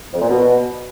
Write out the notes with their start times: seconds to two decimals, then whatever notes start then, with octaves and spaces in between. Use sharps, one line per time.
0.14 F2
0.22 A#2
0.30 B2